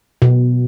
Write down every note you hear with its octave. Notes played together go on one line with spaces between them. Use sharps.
B2